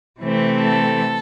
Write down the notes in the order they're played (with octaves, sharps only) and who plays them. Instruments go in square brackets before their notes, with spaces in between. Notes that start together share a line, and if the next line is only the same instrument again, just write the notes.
[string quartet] C3 E3 A3 C4
A4